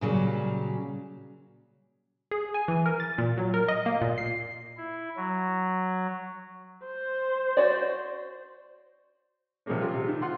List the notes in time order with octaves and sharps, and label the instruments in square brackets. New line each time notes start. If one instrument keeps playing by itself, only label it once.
[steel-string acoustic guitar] A#2 C#3 F#3 G3
[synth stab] G#4
G#5
E3
A#4
A6
A#2
F#3
A#4
D#5
A#3
A#2
C7
[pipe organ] E4
F#3
[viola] C5
[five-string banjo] F#4 C#5 D5
[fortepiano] C3 F3 G3 G#3 A#3 C#4
G#3 F4 G4
C3
D#3
F4 F#5 C6